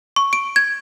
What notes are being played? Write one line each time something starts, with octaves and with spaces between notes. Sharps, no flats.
C#6
D7
G#6